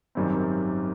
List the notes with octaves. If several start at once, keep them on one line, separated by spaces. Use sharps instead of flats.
G#1 F#2 D#3 G3 C4